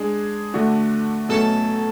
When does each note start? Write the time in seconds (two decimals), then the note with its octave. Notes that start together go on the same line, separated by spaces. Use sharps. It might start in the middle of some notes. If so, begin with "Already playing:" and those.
Already playing: G#3 D4 G#4
0.54 D3 A3 D4 F#4
1.29 B2 F#3 A3 C#4 A4